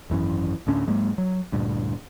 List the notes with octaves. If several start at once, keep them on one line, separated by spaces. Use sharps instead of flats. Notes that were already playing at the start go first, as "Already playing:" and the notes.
G#1 F#2 E3 C#4
D2 A2 C#4 D4
G#2 F#3 G#3 A#3
F#3
D2 G2 A#2